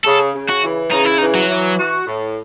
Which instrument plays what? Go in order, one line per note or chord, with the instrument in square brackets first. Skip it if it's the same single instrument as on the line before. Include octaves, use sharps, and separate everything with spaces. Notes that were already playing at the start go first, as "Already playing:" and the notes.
[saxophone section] C#3 [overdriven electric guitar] A4
[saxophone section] C#3
[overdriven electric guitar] F#4
[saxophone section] E3
[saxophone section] C#3 [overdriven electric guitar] D#4
[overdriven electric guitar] E4
[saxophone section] E3 [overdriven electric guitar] D#4
[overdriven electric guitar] F#3
[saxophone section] E3
F#4
A2